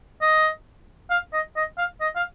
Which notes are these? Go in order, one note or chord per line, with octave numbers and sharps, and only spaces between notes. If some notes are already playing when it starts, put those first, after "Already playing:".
D#5
F5
D#5
D#5
F5
D#5
F5